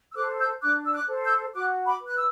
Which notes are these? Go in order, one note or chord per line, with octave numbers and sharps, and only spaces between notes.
E6
A4 C5 D6 F#6
E6 G6
D4 D6 F#6
E6
D6 F#6
A4 C5
E6 G6
F#4 D6 F#6
B5 D6
B4
F#6
E6